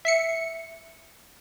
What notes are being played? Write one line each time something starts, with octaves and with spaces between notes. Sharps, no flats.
E5 C7 C#7